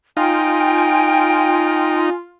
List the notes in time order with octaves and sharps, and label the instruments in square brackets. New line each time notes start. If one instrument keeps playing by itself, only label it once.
[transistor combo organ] D#4 [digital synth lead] F4 [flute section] G5 [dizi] G#5